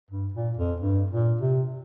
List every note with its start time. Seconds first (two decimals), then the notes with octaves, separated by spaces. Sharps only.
0.11 G2
0.34 A#2
0.58 F2
0.80 G2
1.10 A#2
1.41 C3